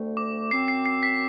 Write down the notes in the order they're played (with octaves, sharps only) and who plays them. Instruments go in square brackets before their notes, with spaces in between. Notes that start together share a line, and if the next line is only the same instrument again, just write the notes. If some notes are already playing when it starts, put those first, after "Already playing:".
Already playing: [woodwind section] D2 D3 A3 C4
[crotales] D6
[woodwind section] F#2 F#3 C4 [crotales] C7
[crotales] C7
C7
B6